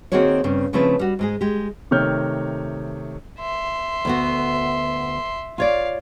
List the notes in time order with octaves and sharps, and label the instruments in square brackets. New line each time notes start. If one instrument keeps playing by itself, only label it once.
[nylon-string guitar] D#3 A#3 C4 F#4 G#4 C#5
G2 C#3 C4
C#3 F3 A3 C4 E4 B4
G3 F#4
G#2 G#3 G#4
G#3 G4
[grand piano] C3 D#3 A3 C#5 F6 G6
[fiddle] E5 C6
[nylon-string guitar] D2 B3 F#4
[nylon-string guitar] F4 C#5 D5 [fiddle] F5